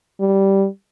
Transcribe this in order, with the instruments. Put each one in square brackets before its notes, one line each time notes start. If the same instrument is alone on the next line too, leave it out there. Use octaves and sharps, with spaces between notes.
[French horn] G3